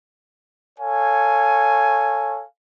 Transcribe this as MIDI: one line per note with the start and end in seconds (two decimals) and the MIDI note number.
0.79 2.44 69
0.79 2.44 73
0.79 2.44 77
0.79 2.44 80